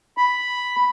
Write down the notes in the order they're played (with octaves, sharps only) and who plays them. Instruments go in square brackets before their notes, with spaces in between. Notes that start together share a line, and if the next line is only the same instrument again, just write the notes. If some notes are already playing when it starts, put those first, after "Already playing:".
[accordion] B5